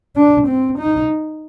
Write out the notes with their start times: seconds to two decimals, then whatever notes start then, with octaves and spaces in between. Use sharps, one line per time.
0.16 D4
0.48 C4
0.79 D#4